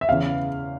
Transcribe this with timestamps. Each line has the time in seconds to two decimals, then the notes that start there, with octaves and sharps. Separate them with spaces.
0.01 E5
0.09 E2 C#3 E3 F5